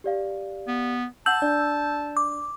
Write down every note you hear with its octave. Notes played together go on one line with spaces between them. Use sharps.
G4 D5 F5
B3
F#5 A5 E6 G6 F#7
D4 D5
D6